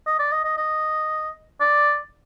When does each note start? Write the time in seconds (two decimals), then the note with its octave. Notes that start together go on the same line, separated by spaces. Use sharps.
0.06 D#5
0.19 D5
0.31 D#5
0.44 D#5
0.57 D#5
1.60 D5